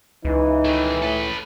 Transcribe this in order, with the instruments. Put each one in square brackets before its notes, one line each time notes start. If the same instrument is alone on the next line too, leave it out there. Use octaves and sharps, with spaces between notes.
[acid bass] C#2 [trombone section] E3 [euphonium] D#4
[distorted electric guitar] D#3 A3
[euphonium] A2 [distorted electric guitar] A4 B4